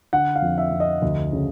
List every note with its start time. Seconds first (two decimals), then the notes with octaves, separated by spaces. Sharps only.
0.13 D3 F#5
0.36 F5
0.42 F2
0.58 E5
0.72 F2
0.80 D#5
1.02 D2
1.33 C#3